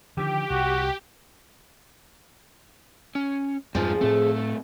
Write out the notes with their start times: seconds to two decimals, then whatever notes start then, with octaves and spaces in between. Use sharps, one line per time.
0.17 D3 D#3 F3 G4
0.50 C2 F#4
3.15 C#4
3.75 F2 G#2 F3 G3 F4 G#4
4.01 A2 A3 C4